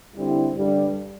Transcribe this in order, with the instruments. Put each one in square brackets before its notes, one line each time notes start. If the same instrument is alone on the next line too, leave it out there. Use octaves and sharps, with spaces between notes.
[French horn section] D3 G3 C4 E4
G2 D3 G3